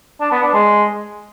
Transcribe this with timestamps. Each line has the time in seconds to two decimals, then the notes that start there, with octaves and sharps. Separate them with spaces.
0.20 D4
0.31 B3
0.43 D4
0.54 G#3